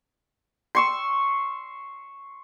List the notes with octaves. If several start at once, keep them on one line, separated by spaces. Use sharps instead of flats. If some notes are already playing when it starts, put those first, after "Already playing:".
C6 C#6 E6